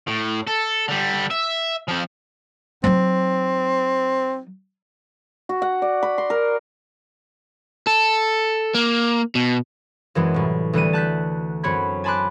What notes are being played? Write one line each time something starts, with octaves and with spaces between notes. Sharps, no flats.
A2
A4
D3 G3
E5
F3 C4
F#3 C4 D#4
F#4
F#5
D5
B5
C6
A#4
A4
A#3
B2
F#2 E3 G#3 C4
C2 A2
D2 E3 G3 D#7
A5 F#6 G6 B6
F#2 C4 C#5 B5 G#6
G#5 A5 B5 C6 D6 F#6